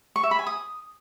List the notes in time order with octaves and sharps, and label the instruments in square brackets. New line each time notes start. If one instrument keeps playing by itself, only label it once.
[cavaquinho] C#6
E5
B5
G#5
D#6